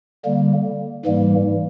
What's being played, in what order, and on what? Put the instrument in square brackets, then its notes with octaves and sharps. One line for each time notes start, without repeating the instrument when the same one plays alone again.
[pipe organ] D3 G3 A#3
G#2 E3 G3 A#3